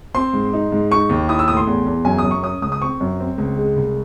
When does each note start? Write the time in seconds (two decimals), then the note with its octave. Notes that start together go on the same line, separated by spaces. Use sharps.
0.14 C4 C6
0.33 G#2
0.53 D#4
0.72 G#2
0.91 D#4 C#6
1.09 D#2
1.29 E4 D#6
1.39 E6
1.48 A2 D#6
1.57 C6
1.67 E2
1.86 E2
2.05 F#2 G#5
2.18 D#6
2.24 F#2
2.31 C#6
2.43 C#4 D#6
2.62 C#2 D#6
2.72 D#6
2.82 C4 C#6
3.01 F#2
3.20 C4
3.38 C#2
3.58 G#3
3.76 C2